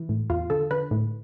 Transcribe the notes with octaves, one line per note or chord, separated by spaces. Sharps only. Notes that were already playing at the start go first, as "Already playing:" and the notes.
Already playing: E3
A2
E2 F4
D3 A4
D3 B4
A2